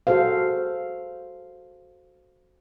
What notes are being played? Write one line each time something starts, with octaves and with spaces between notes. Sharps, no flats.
F#4 G#4 A4 C5 F5